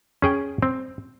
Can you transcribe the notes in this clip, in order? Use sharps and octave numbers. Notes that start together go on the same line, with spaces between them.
C#4 G#4 G5
C4